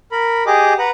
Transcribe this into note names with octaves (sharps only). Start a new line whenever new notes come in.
A#4 B5
G4 G#4 D#5 D6
B4 F#5 A#5